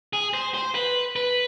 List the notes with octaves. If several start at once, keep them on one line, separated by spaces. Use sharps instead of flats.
G#4
C5
C5
B4
B4